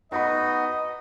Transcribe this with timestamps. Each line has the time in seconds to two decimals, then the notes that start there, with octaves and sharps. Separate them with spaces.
0.12 B3 D#4 F#4 D#5 F#5 B5